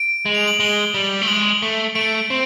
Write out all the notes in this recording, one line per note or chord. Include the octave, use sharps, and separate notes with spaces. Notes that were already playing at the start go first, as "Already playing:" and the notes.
Already playing: D7
G#3
F7
F#7
G#3 G7
G3
A3
G#3 F#7
A3
A3 D7
C4